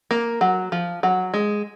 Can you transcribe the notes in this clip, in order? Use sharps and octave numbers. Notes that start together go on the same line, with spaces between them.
A#3
F#3
F3
F#3
G#3